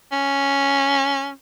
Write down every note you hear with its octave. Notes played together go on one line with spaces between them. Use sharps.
C#4